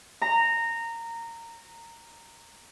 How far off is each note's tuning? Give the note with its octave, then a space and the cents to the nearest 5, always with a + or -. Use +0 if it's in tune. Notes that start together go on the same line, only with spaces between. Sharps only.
A#5 -15